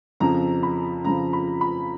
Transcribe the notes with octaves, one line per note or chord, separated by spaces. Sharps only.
F2 C#3 F3 A#5
B5
F2 C#3 F3 A#5
B5
B5